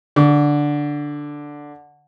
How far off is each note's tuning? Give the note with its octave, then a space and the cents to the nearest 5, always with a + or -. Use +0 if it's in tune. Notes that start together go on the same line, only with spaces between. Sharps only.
D3 +0 C#6 +45